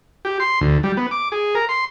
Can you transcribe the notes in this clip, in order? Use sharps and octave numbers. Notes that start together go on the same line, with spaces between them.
G4
C6
D2
G3
B3
D6
G#4
A#4
C6